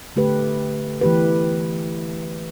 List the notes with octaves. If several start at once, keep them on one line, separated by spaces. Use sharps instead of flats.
D3 A3 G4 B4
E3 A3 G4 B4